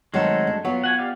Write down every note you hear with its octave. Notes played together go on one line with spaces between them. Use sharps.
D#3 F#3 G#3 A3 C4 A4
D4
F#3 B3 F4
F#5 G#5
G4 D5 F5